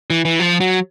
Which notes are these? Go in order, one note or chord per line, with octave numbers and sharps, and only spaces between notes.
E3
E3
F3
F#3